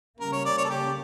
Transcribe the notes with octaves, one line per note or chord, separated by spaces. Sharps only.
C#3 G3 A#3 C#4 A#4
C#5
D5
C#5
A4
G4